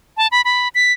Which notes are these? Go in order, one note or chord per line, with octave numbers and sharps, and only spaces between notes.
A5
B5
B5
B6